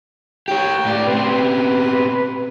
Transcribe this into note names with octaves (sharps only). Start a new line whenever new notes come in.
G4 C#5 G5
A2 D5
B2 C4 B4